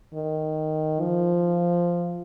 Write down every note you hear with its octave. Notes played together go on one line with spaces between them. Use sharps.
D#3
F3